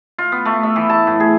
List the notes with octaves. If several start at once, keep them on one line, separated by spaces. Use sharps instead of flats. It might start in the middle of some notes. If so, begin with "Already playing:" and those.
F4
B3
A3
E5
E3
A5
A2
G#4